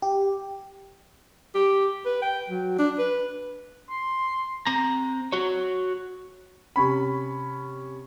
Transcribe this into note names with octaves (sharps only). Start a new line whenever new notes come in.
G4
G4
B4
G5
F#3
D4
B4
C6
C4 A#5
F#4 C#5
C3 C#4 B5